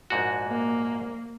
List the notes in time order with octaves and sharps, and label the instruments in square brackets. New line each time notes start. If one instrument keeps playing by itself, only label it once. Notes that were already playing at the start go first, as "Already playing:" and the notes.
[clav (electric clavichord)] A#1 G#2 F#4
[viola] A#3